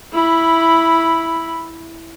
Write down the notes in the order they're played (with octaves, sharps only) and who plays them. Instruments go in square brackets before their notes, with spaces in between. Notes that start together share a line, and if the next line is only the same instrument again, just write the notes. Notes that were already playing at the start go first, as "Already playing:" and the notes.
[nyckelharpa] E4 B5